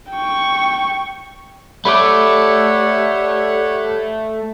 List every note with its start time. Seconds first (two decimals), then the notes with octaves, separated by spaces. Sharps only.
0.11 G5 C#6
1.85 G3 A3 C#5 F#5 B5 D6